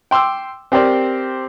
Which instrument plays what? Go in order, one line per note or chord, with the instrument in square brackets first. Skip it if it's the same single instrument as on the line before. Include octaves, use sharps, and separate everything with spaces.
[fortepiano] G5 C6 D6 E6
C4 G4 A#4 C5 D5